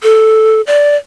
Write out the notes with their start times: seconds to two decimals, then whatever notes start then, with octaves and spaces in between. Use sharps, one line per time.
0.03 A4
0.67 D5